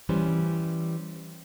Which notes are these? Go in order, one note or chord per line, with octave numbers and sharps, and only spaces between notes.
E3 G3 C#4 C5